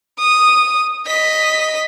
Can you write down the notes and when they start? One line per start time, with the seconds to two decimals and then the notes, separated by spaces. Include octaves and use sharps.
0.19 D#6
1.07 D#5 B6